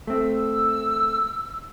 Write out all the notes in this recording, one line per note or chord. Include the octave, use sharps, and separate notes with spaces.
A3 C4 E6